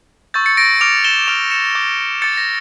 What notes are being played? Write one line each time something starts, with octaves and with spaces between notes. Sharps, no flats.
C#6 E6 G6 A6
A6 C#7
A#6 D7
D6 F6 D7 F7
E7 G7
D6 F6 D7 F7
C#7 E7
D6 G6
D6 G6 A6 C#7
A#6